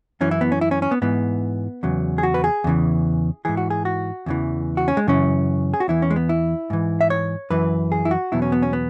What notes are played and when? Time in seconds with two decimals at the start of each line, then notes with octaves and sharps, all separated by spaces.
0.21 F#2 E3 C#4
0.31 E4
0.41 B3
0.52 C#4
0.61 E4
0.71 C#4
0.82 C#4
0.91 B3
1.02 G#2 E3 B3
1.83 E2 C#3 F#3
2.18 G#4
2.23 F#4
2.34 B4
2.44 G#4
2.64 E2 C#3 E3
3.45 G#2 E3 G#4
3.57 F#4
3.70 G#4
3.85 F#4
4.26 E2 C#3 E3
4.77 F#4
4.88 C#4
4.97 G#3
5.07 F#2 C#3 E3 C#4
5.74 G#4
5.80 F#4
5.88 E2 E3 E4
6.02 C#4
6.10 G#3
6.16 B3
6.29 E4
6.70 G#2 E3
7.01 E5
7.10 C#5
7.50 F#2 E3 B4
7.92 G#4
8.05 E4
8.11 F#4
8.32 E2 B2 F#3 E4
8.42 C#4
8.52 B3
8.62 C#4
8.73 B3